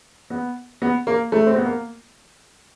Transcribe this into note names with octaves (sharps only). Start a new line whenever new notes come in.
B3
B3
A#3
A3
C4
B3
A#3